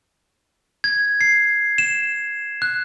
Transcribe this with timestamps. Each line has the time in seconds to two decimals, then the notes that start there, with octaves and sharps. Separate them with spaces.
0.84 G#6
1.21 C7
1.78 E7
2.62 F#6